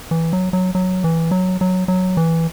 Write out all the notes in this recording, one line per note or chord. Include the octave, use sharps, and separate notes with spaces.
E3
F#3
F#3
F#3
E3
F#3
F#3
F#3
E3